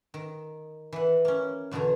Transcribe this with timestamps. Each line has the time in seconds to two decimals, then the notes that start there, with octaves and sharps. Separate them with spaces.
0.14 D#3
0.93 E3 F#5
1.25 A#3 C#4
1.71 E2 B2 D3 C#5 A#5